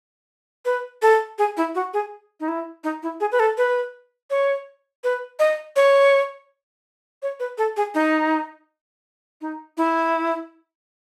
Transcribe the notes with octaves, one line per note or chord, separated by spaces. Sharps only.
B4
A4
G#4
E4
F#4
G#4
D#4
E4
D#4
E4
G#4
B4
A4
B4
C#5
B4
D#5
C#5
C#5
B4
A4
G#4
D#4
D#4
E4